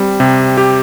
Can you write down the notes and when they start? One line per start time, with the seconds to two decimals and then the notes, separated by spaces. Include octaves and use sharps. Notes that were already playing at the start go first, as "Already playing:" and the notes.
Already playing: G3 C4
0.20 C3
0.57 G4